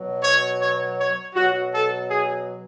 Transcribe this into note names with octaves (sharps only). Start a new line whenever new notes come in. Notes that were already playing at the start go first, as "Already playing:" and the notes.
Already playing: B2 F#3
C#5
C#5
C#5
B2 F#3 F#4
A4
G#4